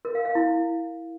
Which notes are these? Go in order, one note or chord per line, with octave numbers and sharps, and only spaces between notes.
A#4
F5
F5
E4